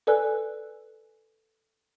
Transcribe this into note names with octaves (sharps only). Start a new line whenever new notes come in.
A4 B4 D5 G#5 E6 F#6